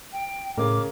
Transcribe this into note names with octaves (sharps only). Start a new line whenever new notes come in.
G5
A2 C#3 A#4 D6